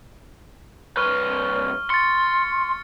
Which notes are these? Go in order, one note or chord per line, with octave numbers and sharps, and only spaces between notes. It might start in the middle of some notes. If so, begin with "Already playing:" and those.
C2 B4 C#6 F6
C6 A6 C#7